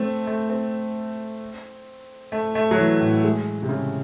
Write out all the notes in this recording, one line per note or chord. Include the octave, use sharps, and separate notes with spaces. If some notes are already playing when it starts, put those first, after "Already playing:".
Already playing: A3 C4
A3
C4
A3
A3
F#3
E3
A2
G#3
C3
C#3